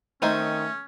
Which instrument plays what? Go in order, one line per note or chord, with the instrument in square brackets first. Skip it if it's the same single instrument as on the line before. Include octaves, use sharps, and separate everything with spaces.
[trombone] D#3 [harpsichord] A3 G#5 [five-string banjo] C4 D#4 C5 [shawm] C#4